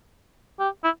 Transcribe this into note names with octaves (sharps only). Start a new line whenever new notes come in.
G4
E4